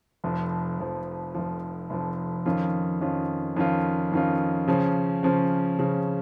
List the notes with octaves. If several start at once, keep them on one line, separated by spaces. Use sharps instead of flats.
F1 F2 F3
F1 F2 F3
F1 F2 F3
F1 F2 F3
F2 D#3 C#4 F4
F2 D#3 C#4 F4
F2 D#3 C#4 F4
F2 D#3 C#4 F4
C#3 F3 C#4
C#3 F3 C#4
C#3 F3 C#4